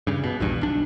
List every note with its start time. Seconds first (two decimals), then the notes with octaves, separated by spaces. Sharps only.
0.07 G2 C#3
0.24 B2
0.40 A#1 E2 G2
0.61 B1 D4